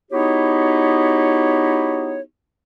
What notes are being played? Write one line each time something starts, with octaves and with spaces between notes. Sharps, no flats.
B3 D#4 E4 F#4 G4 C#5